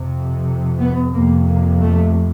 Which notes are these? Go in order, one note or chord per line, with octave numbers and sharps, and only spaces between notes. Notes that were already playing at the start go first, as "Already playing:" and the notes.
Already playing: F2 C3
B3
F2 C3 A#3
A#3
A3